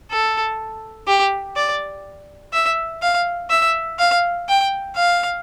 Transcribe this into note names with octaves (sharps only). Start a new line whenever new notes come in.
A4
G4
D5
E5
F5
E5
F5
G5
F5